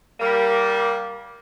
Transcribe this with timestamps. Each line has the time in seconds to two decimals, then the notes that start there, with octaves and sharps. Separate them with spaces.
0.20 G3 A#3